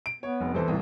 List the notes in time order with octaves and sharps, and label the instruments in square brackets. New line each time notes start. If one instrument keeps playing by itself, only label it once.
[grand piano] D7
[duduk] B3 [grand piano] C#5
[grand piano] F1
[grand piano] E2 A4 C5 [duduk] E3
[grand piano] C2 A2